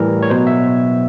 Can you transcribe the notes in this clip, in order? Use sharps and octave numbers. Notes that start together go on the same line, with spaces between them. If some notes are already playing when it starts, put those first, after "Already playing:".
Already playing: A2 E3 G3 A#4
C#5
B2 F#3 C5
E5